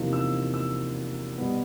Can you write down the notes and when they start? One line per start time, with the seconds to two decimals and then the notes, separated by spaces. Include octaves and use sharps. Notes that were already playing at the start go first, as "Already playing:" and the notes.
Already playing: E2 C3 F3 A#3 D#4
0.13 E6
0.54 E6
1.38 B2 G3 B3